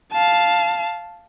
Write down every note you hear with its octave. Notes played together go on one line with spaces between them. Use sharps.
F5 A5